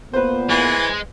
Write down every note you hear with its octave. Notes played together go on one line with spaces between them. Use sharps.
A#2 B3 B4 C5
E3 G#3